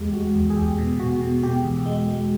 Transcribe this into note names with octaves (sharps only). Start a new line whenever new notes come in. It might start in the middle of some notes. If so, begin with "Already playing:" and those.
Already playing: E2 G#3 G4
G#3 F#4
E2
G#4
E2 G4
B2
B2 F#4
B2
B2 G4
E2
G#3
G#3